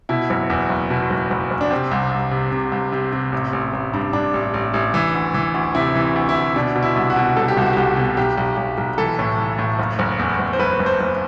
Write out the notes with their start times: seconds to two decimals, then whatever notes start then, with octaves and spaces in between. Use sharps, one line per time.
0.09 B2 E4
0.30 F#1
0.50 E2
0.69 F#1
0.90 B2
1.10 F#1
1.30 F#1
1.51 F#1
1.61 D4
1.71 C3 C4
1.91 C2
2.11 C2
2.31 C3
2.52 C3
2.72 C2
2.92 C3
3.12 C3
3.32 A1
3.53 A1
3.73 A1
3.93 G2
4.13 G2 D4
4.34 A1
4.54 A1
4.74 A1
4.94 E3
5.14 D2
5.34 E3
5.54 D2
5.75 C3 E4
5.95 E3
6.16 D2
6.29 E4
6.35 D2
6.56 B2 D4
6.75 B2
6.83 E4
6.96 C2
7.10 F#4
7.16 B2
7.36 C2 A4
7.48 G4
7.57 C2 F#4
7.73 C2 G4
7.97 B2
8.17 B1 G4
8.38 B1
8.57 B1
8.78 B1
8.98 E3 A4
9.19 A2
9.38 E3
9.59 A2
9.79 F#1
9.99 F#1
10.19 E2
10.39 F#1
10.53 C5
10.59 F#1 B4
10.79 F#1
10.86 C5
11.00 F#1